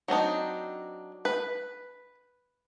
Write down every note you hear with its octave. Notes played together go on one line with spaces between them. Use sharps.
F#3 C4 D4 D#4
B4